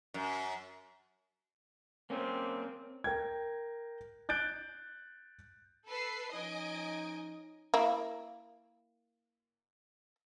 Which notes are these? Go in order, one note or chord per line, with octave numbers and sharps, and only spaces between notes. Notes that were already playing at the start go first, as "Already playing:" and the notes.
F#2
A#3 C4 C#4
A#4 G5 G#6
F#6 G6 A6 D7
A4 B4 C7
F3 C#4 D#4 D#5 G#5 D7
A#3 E4